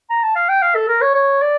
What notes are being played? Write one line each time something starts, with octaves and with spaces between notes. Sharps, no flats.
A#5
A5
F5
G5
F5
A4
A#4
C#5
C#5
D5